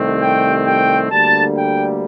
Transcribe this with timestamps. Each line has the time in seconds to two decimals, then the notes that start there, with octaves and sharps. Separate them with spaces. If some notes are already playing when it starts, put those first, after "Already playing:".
Already playing: C2 C3 D#3 A3 C4
0.21 G5
0.66 G5
1.11 D2 D3 G3 A#3 A5
1.57 G5